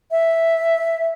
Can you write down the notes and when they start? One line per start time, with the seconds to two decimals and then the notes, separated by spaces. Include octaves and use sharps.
0.11 E5